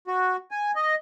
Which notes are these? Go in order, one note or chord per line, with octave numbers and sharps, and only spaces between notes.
F#4
G#5
D#5